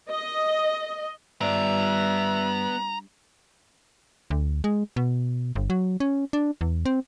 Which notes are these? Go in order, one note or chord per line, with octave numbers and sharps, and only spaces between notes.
D#5
G2 B3 D5 E5 A#5
D2
G#3
B2
G1
F#3
C#4
D4
E2
C4